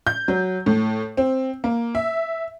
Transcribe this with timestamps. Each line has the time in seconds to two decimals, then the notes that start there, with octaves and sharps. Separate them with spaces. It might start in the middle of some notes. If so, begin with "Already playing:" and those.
0.07 G6
0.28 F#3
0.66 A2
1.17 C4
1.64 A#3
1.95 E5